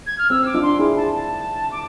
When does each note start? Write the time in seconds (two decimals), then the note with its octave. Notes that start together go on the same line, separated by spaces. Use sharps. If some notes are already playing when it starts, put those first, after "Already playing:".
0.06 G#6
0.19 F6
0.30 C4 E6
0.46 D6
0.54 D4 F4
0.63 C6
0.79 E4 G#4
0.97 A5
1.13 A5
1.72 D6